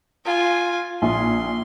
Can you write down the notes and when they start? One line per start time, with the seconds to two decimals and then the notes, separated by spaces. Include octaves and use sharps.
0.25 F4 G#5
1.02 A#1 G#5 C6